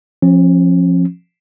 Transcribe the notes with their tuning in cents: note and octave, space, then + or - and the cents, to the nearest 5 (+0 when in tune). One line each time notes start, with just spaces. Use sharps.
F3 +0 C#4 -40